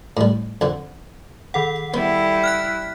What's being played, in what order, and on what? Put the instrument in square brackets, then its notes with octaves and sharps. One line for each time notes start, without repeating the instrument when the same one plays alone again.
[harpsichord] A2 G3
F2 D3
[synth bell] D#3 A4 F#5
[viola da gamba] G3 E4 [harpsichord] B3
[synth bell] F6 F#6 B6